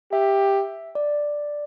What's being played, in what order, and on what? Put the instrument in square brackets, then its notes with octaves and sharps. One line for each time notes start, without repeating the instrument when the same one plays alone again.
[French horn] G4 [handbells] E5
[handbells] D5